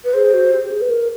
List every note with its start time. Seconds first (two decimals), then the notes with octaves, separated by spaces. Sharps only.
0.05 B4
0.14 G#4 C5
0.34 F#4
0.52 G4
0.64 G4
0.72 G#4
0.81 B4
0.90 A#4